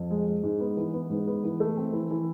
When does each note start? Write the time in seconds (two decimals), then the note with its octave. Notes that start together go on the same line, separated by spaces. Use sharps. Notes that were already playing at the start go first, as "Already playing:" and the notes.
Already playing: F2
0.10 G#3
0.26 G#3
0.43 G#2
0.60 B3
0.77 E3
0.94 B3
1.10 G#2
1.27 B3
1.44 E3
1.60 A3
1.77 C4
1.93 E3
2.11 E3